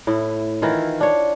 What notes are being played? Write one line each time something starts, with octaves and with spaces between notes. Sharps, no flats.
A2 E4
D#3 E3 E4 F4
D4 C#5